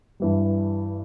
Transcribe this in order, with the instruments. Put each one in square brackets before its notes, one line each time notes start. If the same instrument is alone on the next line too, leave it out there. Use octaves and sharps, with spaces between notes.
[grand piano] G2 E3 G3